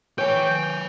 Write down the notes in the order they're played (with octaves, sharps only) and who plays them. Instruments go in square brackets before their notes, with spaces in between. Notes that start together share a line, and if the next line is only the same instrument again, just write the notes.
[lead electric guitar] B4 G#5 [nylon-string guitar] C#5 [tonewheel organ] G5